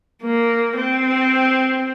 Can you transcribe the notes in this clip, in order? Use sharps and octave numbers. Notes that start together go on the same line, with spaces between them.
A#3
C4